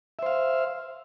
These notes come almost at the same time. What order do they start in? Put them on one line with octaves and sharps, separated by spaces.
E5 C5 F5